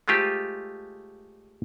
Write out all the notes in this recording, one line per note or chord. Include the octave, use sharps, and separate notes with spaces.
G#3 A3 F4 G4 C5